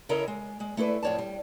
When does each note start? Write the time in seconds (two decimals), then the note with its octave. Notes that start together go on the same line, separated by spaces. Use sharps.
0.09 C#3 E4 A4 A#4 C#5 D#5
0.28 G#3
0.60 G#3
0.77 A3 E4 A4 B4 D5
1.03 F2 A2 C#5 D5 A5
1.19 G3